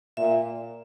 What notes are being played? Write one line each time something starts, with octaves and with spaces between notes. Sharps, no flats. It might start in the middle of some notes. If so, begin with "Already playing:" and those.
A#2 E5